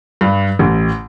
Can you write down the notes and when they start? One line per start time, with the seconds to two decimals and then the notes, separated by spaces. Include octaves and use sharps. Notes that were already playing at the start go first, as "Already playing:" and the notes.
0.21 G2
0.59 A1